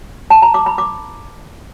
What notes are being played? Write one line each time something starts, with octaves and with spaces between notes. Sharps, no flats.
A5
A#5
D6
B5
D6